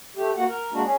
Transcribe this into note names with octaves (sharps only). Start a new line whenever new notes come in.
A3 G4
A#3 F#4 F#5
A#4
G#3 A#3 D4 F#4
C#4 G#4